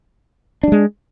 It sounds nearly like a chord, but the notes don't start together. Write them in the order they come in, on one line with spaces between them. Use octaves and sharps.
D4 G3 G#3